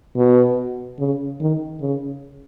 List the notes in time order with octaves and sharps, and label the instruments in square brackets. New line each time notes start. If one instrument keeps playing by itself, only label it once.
[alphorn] B2
C#3
D#3
C#3